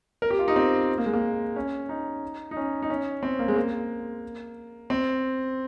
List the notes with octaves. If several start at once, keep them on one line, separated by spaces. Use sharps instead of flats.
A#4
G4
F4
D#4
C4
A#3
G#3
A#3
C#4
D#4
D#4
C#4
D#4
C#4
C4
A#3
G#3
A#3
C4